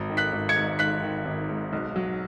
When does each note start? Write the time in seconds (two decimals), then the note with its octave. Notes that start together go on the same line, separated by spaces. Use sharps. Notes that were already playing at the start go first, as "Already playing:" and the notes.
Already playing: G#1
0.10 D#3
0.17 F#6 B6
0.33 G#1
0.49 G#6 C#7
0.56 G#2
0.79 G#1 F#6 B6
1.02 D#3
1.25 G#1
1.49 G#2
1.73 B1
1.96 F#3